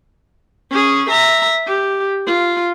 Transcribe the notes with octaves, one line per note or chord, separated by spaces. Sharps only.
C#4 G#4
E5 A#5
G4
F4